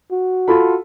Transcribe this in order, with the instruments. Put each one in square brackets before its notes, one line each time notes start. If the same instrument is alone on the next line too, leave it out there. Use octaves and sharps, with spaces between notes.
[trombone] F#4
[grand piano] F4 A4 B5